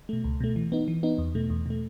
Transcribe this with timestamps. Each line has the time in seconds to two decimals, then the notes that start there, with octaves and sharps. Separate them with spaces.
0.09 B2 A3
0.24 C#2
0.40 B2 A3
0.56 E3
0.72 B3 D#4
0.88 E3
1.03 B3 D#4
1.18 E2
1.35 B2 A3
1.50 E2
1.66 B2 A3